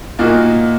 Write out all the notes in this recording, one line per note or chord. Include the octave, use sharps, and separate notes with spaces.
A#2 A#3 D#4 F#4